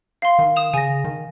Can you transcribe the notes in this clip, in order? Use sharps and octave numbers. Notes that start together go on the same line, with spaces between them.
F5 C6
D#3
D#6 E7 F7
C#3 G#5 A#6
D#3